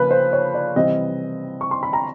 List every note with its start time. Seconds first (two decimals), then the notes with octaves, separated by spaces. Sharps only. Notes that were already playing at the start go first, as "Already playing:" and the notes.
Already playing: C#3 F3 A#3 B4
0.11 C5
0.33 C#5
0.54 D5
0.76 C3 E3 G3 C4 D#5
1.61 C#6
1.71 C6
1.83 B5
1.93 A#5